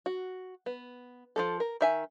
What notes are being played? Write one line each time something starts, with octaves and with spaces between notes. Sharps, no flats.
F#4
B3
F3 A3 A4
A#4
D#3 E5 G#5